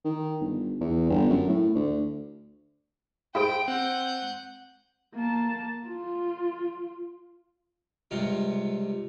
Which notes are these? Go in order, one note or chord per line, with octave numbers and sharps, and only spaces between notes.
D#3
G1
E2
G1
F#2
A2
D2
E4 G#4 C5 G5 D7
C4 F#5 G6
A#3 A5
F4
C#2 G2 C3 F4